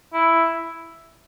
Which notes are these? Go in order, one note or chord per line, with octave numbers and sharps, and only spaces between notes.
E4